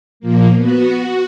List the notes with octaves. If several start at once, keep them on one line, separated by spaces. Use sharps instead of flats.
A#2 F3 A#3
B3 F#4
F#4